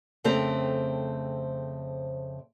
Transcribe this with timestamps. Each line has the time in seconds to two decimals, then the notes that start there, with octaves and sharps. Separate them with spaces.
0.24 F2 C#3 A3 C4 A#4 C5